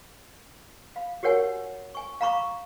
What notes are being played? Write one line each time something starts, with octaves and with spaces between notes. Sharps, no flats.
F5 B5
F#4 G4 A#4 C#5 F#5 G#5
G#5 C#6
F5 A#5 B5 C#6 D6